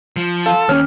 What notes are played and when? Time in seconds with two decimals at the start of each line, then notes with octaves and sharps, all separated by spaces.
0.16 F3
0.46 F4 A4 E6
0.69 D#2 C#4 C#5 F6